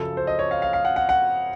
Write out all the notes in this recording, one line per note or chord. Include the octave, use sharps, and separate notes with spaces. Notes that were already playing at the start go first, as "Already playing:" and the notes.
Already playing: F#2 C#3 F3 A4
C5
D#5
C#5
F5
F5
F5
F#5
F#5
F#5